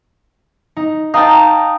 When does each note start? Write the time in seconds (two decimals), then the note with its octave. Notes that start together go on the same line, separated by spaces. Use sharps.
0.77 D#4
1.14 D#4 F5 G5 A5